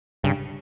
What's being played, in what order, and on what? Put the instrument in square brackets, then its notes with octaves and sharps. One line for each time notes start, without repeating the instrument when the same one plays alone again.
[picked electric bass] G2 [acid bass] C#3